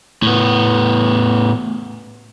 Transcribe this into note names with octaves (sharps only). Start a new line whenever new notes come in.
A2 B3